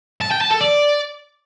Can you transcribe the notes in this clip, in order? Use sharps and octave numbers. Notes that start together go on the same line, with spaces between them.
A5
G5
A5
A4
D5